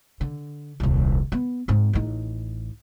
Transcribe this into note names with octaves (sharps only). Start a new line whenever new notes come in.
D3
D#1 C2
B3
G#2 C4
A1 D#4